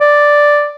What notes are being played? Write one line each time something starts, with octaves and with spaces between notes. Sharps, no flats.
D5